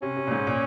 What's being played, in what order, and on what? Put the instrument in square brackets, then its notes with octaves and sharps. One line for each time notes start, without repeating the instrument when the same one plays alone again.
[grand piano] C3 [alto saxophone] C#4
[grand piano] C3
A#2
G#2
A#2